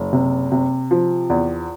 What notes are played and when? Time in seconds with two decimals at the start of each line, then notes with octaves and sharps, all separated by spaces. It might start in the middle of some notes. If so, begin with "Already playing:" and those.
Already playing: F#1
0.13 C3
0.52 C3
0.91 F3
1.30 E2